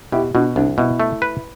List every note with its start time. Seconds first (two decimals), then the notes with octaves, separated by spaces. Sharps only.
0.12 B2 E4 G4
0.35 B2 D4 F#4
0.56 C2 D4
0.78 B2 E4
1.00 A3
1.22 B4